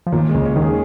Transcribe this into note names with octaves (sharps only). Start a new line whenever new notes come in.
F3
D#2 A#2 D#3
G#3
C#2 C#3
C#4
D#2 D#3
G#4